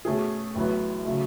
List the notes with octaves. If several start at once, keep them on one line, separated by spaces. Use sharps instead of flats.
B2 A3 C#4 G#4
A1 A2 F#3 B3
C#3 F#3 A3